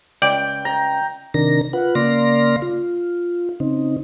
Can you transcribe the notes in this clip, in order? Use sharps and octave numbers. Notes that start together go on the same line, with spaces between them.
C#2 D5 G5
A#5
C3 D#3 D4 A#4 A#6
F4 B4 F#5
C#3 A#3 D5 F5 C6 A#6
F4
C#3 C4 D#4